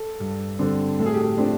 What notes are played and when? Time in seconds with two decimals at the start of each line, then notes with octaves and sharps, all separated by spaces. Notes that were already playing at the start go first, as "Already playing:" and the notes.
Already playing: A4
0.20 G2
0.59 D3 G3 C4
0.99 A2 A4
1.06 G#4
1.14 G4
1.22 G#4
1.37 F3 A3 C4 D4